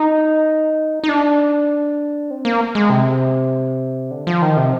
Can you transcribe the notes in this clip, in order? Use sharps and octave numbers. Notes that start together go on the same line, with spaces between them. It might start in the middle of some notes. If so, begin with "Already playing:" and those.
Already playing: D#4
D#4
D4
C4
A#3
G#3
C3
D3
F3
D#3
C3